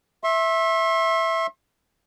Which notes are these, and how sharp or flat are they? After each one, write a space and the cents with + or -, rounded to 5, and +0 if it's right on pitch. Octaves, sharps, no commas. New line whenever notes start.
E5 -5 C6 +40